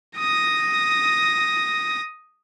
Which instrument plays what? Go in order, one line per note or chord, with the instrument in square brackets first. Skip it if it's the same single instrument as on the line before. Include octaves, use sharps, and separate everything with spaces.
[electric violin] D#6 A#6